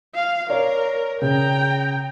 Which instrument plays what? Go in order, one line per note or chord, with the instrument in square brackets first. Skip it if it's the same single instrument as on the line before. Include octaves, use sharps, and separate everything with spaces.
[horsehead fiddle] F5
[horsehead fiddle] A#4 [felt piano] C#5 D5
[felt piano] C#3 [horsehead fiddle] G5 A#5